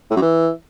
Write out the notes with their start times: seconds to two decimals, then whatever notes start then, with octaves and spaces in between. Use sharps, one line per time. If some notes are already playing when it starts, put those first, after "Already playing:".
0.11 A2
0.16 F#2
0.22 E3